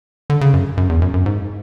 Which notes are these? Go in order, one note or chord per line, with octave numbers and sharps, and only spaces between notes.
D3
C#3
F#2
F#2
E2
F#2
F#2
G#2